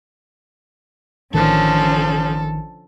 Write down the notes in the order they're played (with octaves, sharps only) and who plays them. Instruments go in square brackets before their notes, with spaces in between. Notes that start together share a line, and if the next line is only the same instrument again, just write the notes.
[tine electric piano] A1 D#3 [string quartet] D3 F3 C#4 [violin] A4